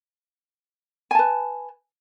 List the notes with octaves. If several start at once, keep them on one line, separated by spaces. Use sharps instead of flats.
B4 G#5 A5